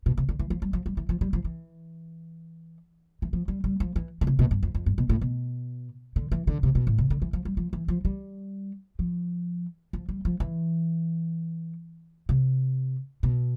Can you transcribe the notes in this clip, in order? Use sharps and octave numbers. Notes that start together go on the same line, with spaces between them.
B2
C3
D3
E3
F3
G3
F3
G3
E3
F3
G3
F3
E3
E3
F3
G3
G3
F3
E3
D3
C3
B2
G2
F2
F2
G2
B2
A2
B2
D3
E3
D3
C3
B2
A2
C3
D3
E3
F3
G3
F3
E3
F3
G3
F3
F3
G3
F3
E3
C3
B2